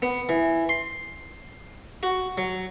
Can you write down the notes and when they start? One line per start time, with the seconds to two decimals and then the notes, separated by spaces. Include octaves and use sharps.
0.02 B3
0.29 E3
0.69 C6
2.03 F#4
2.38 F#3